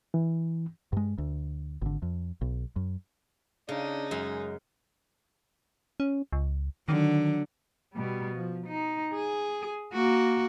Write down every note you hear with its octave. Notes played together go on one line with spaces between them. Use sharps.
E3
G2 G#3
D2
G#1 D3
F2
B1
F#2
C#3 D4 D#4
F#2 G#3
C#4
C#2
D3 D#3 F#3
B2 G3
F3
D#4
G#4
A#3 F#4